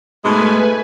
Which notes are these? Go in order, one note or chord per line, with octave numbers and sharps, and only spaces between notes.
G#2 B2 G#3 A3 B4 G#5